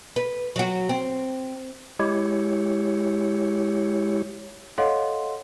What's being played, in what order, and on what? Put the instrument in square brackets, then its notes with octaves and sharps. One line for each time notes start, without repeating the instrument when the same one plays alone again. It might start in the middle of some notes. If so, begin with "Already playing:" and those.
[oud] B4
F#3 F#4
C4
[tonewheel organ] G#3 E4 G4 C#5
[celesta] A4 C#5 D#5 F5 F#5 C6